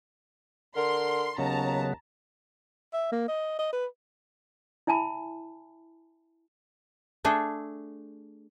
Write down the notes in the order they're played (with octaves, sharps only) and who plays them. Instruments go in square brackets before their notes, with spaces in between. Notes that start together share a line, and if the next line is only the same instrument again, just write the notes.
[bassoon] D3 [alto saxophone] A#4 [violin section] C6
[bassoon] D#2 [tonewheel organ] C#3 F#3 B3 [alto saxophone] C#4 [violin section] A5 A#5
[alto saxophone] E5
A#3
D#5
D#5
B4
[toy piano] E4 E5 G#5 A5 B5
[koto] A3 D4 G#4 A4